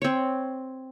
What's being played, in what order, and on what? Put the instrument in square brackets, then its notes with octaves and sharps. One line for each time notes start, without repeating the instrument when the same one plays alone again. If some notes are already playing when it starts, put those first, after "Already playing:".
[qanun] C4 C#5